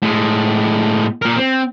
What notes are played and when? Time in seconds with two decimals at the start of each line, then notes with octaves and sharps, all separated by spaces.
0.02 A2 G#3
1.22 A#2 A#4
1.36 C4